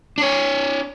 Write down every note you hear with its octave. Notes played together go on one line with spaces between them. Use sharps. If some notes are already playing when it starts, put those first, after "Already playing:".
D4 C#5